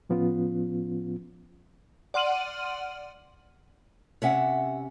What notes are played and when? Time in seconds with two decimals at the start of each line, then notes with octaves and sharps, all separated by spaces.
0.09 A2 F3 B3 C#4 F4
2.14 D5 F#5 C6 F6 D#7 F#7
4.22 C3 C#4 E5 F#5